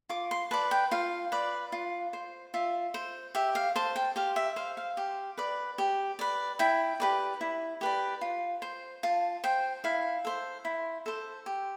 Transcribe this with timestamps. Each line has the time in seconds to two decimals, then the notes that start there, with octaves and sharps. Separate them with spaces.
0.09 F4 D6
0.31 C6
0.51 B4 D5 A5
0.71 G5
0.91 F4 F5
1.32 B4 D5
1.72 F4
2.13 C5
2.54 F4 E5
2.94 C5
3.35 G4 E5
3.55 F5
3.76 C5 A5
3.96 G5
4.16 G4 F5
4.36 E5
4.56 C5 F5
4.77 F5
4.97 G4
5.38 B4 D5
5.78 G4
6.19 B4 D5
6.59 E4 G5
7.00 G4 B4 D5
7.41 E4
7.81 G4 B4 D5
8.21 F4
8.62 C5
9.03 F4 A5
9.44 C5 G5
9.84 E4 F5
10.25 A4 C5
10.65 E4
11.06 A4 C5
11.46 G4